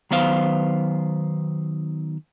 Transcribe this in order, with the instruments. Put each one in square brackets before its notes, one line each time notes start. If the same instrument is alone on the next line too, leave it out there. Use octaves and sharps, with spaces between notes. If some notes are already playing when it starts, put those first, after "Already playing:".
[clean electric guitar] D#3 F#3 B3 C5 F5